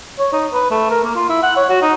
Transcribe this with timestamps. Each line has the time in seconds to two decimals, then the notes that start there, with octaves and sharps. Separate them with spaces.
0.19 C#5
0.33 D#4
0.52 B4
0.71 A3
0.90 A#4
1.04 A#3
1.16 F4
1.29 E4
1.43 F#5
1.57 C#5
1.69 F#4
1.82 D#4